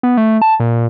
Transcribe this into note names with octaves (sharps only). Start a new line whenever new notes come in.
B3
A3
A5
A#2